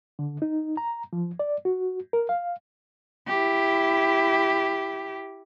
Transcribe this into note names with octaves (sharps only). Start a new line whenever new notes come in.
D3
D#4
A#5
F3
D5
F#4
A#4
F5
E4 G4